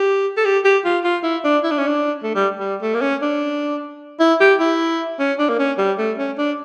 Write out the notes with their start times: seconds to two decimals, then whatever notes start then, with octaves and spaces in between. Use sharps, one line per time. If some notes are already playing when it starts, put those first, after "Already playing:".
Already playing: G4
0.37 A4
0.45 G4
0.64 G4
0.85 F4
1.04 F4
1.23 E4
1.44 D4
1.64 E4
1.71 D4
1.78 C#4
1.87 D4
2.23 A3
2.35 G3
2.59 G3
2.82 A3
2.94 A#3
3.01 C#4
3.22 D4
4.20 E4
4.40 G4
4.60 E4
5.19 C#4
5.39 D4
5.49 A#3
5.59 C#4
5.78 G3
5.98 A3
6.18 C#4
6.38 D4